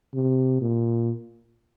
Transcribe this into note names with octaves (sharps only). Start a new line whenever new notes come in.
C3
A#2